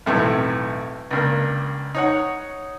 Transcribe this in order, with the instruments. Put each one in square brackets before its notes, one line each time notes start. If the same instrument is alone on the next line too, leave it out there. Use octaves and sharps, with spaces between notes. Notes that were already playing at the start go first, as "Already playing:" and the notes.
[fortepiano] B1 E2 A2 C3
C#2 G2 A#3
D#4 C#5 F#5